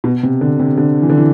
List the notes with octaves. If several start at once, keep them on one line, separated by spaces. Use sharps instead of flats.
B2
C3
D3
C3
D3
E3
D3
E3